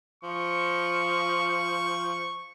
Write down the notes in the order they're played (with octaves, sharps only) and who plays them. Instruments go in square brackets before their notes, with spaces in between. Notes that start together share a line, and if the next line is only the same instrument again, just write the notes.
[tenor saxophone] F3 [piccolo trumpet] C#6